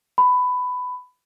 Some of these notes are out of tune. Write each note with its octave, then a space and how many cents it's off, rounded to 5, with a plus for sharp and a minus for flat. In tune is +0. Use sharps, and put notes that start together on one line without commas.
B5 +15